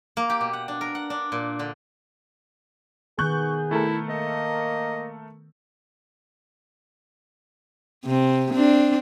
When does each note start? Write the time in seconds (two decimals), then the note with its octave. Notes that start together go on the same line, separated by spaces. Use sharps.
0.17 A#3
0.30 G4
0.41 B2
0.53 F#5
0.68 D4
0.81 A#4
0.95 F#5
1.10 D4
1.32 A#2
1.59 D3
3.19 D#3 B3 G#4 C#6 F#6 G6
3.71 A3 E4 A4 A#4
4.09 A#3 D#5
8.05 C3 C4
8.53 C4 D4